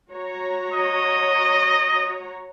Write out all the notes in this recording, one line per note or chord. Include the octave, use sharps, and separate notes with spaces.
F#4 C#5 A#5
D#5